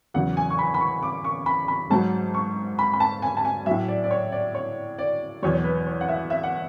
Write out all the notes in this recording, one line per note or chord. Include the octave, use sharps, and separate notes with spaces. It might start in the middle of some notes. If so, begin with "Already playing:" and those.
E2 C#3 F#3 F#5
G#5
C#6
B5
B5
C#6
D6
C#6
B5
B5
G#2 F#3 A5
C#6
B5
B5
A5
G#5
A5
G#5
A2 F#3 E5
D5
D5
C#5
D5
C#5
D5
E2 B2 F#3 C#5
C#5
B4
C#5
F#5
E5
E5
F#5